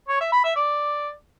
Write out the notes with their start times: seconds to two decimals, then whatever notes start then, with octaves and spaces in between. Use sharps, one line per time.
0.08 C#5
0.20 E5
0.32 B5
0.44 E5
0.56 D5